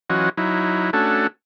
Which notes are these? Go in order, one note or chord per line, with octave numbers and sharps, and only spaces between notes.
E3 F#3 C#4 F4 F#4 D#5
F#3 D#4 E4
A3 C#4 D4 F#4 A4